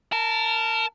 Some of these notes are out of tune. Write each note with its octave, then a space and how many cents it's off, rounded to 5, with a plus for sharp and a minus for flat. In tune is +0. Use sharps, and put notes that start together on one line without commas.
A#4 -20 A5 +0